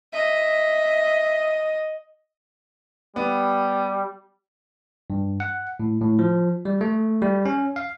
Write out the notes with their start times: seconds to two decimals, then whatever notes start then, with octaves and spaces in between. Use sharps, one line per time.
0.13 D#5 E5
3.16 G3 B3
5.10 G2
5.40 F#5
5.80 A2
6.02 A2
6.19 F3
6.65 G3
6.81 A3
7.22 G3
7.45 C#4
7.76 F5